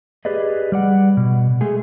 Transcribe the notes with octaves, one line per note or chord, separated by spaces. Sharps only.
G4 G#4 B4 D5 D#5
G3 D5 F#5
B2
G#3 A3 G#4